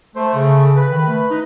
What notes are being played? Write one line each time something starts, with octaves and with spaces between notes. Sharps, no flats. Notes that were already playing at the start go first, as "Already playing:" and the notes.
A3 C5
C#3
B4
D#3
A3
D#4